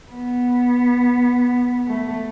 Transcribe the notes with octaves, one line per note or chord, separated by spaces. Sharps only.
B3
A3